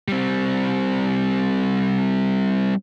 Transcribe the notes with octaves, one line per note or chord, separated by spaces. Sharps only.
G3 C4